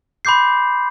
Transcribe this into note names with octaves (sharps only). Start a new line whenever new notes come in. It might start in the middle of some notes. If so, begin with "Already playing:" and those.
B5 C6 D6 G6 C7